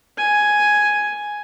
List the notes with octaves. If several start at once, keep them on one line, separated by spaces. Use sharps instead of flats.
G#5